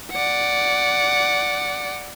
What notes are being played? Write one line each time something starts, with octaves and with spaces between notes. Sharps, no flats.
D5 F#5